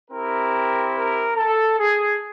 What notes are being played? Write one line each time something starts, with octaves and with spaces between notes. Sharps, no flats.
C4 E4 G4 A#4
A#4
A4
G#4